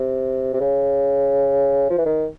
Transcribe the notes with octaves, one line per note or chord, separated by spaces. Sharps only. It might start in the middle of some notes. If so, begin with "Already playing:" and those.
Already playing: C3
C3
C#3
F3
E3
D#3